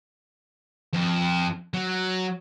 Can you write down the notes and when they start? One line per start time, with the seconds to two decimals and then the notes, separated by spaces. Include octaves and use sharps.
0.94 F2
1.74 F#3